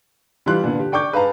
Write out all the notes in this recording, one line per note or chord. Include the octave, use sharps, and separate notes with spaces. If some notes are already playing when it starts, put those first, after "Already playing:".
E3 G3 F4 G4 C6 F#6
A#2 D3 B3
G4
D5 G5 C#6 D6 G6
G#4 B4 F5 A5 A#5